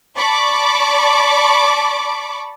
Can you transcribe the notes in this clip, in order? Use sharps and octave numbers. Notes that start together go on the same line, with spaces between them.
D5 A5 B5 C#6 D6